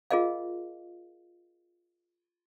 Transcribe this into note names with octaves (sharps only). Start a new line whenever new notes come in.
F4 G#4 A#4 D#5 F5